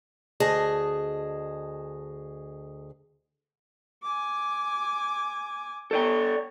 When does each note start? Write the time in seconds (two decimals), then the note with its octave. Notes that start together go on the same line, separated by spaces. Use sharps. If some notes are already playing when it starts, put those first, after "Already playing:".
0.40 D2 G#4 D#5 G#5 A5
4.03 G#5 D6
5.91 A4 C#5 D5 G5